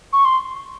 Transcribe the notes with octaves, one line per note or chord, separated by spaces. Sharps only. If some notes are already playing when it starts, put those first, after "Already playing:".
C#6
C6